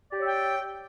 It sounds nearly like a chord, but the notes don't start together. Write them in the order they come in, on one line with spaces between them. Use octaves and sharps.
D5 G4 C#5 E5 G5